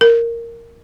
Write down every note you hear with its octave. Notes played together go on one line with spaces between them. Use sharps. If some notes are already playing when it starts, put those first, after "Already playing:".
A#4